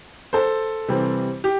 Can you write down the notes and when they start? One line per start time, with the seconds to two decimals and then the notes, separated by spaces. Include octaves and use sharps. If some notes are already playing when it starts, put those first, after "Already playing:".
0.33 A4 C5
0.88 C3 E3 G3 C4
1.44 G4